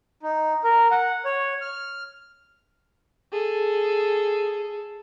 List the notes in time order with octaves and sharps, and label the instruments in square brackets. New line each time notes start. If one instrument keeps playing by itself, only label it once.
[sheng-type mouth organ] D#4
A#4
F#5
C#5
F6
[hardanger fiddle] G#4 A4